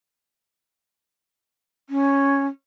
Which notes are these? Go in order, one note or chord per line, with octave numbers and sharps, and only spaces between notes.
C#4